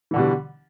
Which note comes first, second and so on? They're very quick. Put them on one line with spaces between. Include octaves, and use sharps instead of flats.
E3 D3 B2 G3